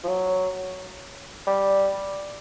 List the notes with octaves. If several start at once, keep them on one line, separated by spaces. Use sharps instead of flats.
F3
F#3
G3